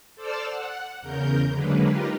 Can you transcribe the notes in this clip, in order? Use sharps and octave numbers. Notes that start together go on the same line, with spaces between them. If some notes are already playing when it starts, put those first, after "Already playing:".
A4 C5 D5 A5 E6 F6
F#5
E2 C#3 A#4 G6
D3 F#3 G#3 A#3 B4
D#4 F4 G4 A#4 B4